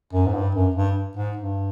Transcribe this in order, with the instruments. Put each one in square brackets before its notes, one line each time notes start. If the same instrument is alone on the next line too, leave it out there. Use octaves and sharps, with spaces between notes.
[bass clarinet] F#2
G#2
G2
F#2
G2
G#2
G2